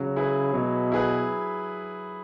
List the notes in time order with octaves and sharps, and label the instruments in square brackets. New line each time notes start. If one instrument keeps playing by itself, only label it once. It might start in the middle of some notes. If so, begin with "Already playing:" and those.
Already playing: [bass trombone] C#3 [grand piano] F#3
[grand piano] E4 G#4 B4
[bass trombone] B2 [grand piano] F#3
[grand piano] E4 G#4 B4